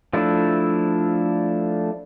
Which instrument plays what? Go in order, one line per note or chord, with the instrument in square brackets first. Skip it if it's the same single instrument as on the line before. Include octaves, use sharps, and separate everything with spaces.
[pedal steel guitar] F3 A3 D4 E4